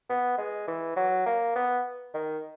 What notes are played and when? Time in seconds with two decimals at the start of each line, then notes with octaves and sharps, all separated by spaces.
0.09 B3
0.38 G#3
0.68 E3
0.96 F#3
1.26 A#3
1.55 B3
2.14 D#3